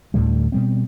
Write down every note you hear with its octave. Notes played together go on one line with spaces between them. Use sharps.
D2 A2 D3 G3
B2 G3 C4